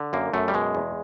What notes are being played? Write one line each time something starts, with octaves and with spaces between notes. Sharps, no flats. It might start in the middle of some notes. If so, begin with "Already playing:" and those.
Already playing: D3
F#2 A#3
F#2 A3
G3
B2 G#3
E2